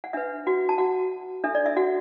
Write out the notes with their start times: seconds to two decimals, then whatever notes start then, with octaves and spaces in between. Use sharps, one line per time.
0.04 F#5
0.13 D4 B4 E5
0.47 F#4 F#5
0.69 A5
0.78 F#4 F#5
1.44 D4 A4 E5
1.55 D5
1.66 E5
1.76 F#4 F#5